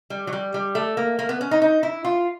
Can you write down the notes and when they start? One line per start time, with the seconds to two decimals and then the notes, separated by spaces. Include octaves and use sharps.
0.10 G3
0.27 F#3
0.33 G3
0.54 G3
0.75 A3
0.97 A#3
1.19 A#3
1.29 B3
1.41 C#4
1.51 D#4
1.62 D#4
1.83 E4
2.05 F4